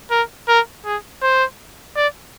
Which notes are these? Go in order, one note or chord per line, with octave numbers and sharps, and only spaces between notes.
A#4
A#4
G#4
C5
D5